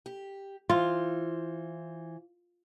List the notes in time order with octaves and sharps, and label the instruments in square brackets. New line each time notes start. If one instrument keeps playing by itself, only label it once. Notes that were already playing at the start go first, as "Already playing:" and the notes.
[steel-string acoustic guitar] G4
[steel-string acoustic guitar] E3 C5 [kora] F4